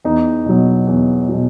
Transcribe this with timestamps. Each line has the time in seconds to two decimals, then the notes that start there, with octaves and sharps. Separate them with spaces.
0.04 E2 D#4
0.46 B2 F#3
0.87 E2
1.29 B2 F#3